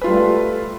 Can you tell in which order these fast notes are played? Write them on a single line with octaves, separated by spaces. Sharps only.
B4 F4 G3 A3